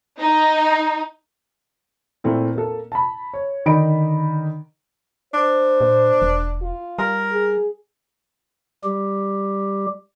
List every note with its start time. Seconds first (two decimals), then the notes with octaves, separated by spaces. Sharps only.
0.19 D#4
2.24 A#2 A3 C4 E4
2.55 A#3 A4
2.92 A5 B5
3.34 C#5
3.66 D3 D#3 D#4 D5 B5 D7
5.34 D4 C5
5.81 A#2
6.21 E1
6.62 F4
6.99 G3 A#4
7.32 G#4
8.84 G3 G4